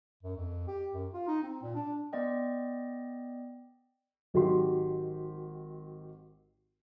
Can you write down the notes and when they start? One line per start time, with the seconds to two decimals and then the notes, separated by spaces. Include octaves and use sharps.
0.23 F#2
0.36 F2
0.67 G4
0.93 F#2
1.13 F4
1.27 D#4
1.43 C4
1.63 A#2
1.74 D4
2.13 B3 D5 D#5 G5
4.34 G#1 D#3 F#3 G4 C6